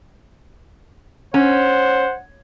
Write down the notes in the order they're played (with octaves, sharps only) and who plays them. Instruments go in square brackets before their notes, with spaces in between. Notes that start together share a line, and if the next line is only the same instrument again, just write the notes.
[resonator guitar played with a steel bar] C#4 [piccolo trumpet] C5 [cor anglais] F#5